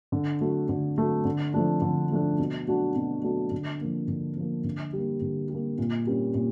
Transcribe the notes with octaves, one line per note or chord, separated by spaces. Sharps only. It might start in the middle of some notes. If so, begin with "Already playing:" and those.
D3
F#3 A3
D3
F#3 A3
D3
F3 A3 D4
D3
F3 A3 D4
B2
F#3 A3 D4 F#4
B2
F#3 A3 D4 F#4
D3
F3 A#3
D3
F3 A#3
D3
G3
A#3
D3
G3
A#3
A#2
G3 A#3 C#4
A#2